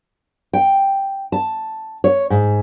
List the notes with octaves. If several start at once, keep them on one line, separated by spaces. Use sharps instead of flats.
G5
A5
C#5
G#2